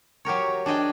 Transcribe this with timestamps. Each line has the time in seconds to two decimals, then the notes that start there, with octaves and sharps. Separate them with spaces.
0.25 F#3 G4 A#4 C#5
0.66 D4 G#4 D#5 G5